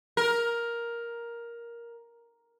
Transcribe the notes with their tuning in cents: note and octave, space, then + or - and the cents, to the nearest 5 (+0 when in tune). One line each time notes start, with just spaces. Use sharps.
A#4 +10